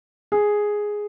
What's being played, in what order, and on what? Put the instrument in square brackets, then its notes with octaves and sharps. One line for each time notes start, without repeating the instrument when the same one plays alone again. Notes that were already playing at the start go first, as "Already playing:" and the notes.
[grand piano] G#4